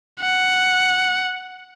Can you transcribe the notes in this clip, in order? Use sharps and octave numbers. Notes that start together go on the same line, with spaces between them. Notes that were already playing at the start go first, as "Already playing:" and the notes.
F#5